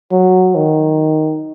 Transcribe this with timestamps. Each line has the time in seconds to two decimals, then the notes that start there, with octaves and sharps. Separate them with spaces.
0.12 F#3
0.55 D#3